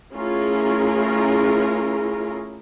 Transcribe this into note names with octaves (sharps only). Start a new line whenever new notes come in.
A3 C#4 E4 F4 G#4 A#4